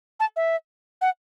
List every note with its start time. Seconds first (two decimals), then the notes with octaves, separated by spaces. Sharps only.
0.20 A5
0.36 E5
1.01 F#5